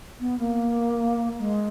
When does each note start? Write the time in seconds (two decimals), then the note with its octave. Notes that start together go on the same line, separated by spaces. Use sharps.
0.20 B3
0.39 A#3
1.39 G#3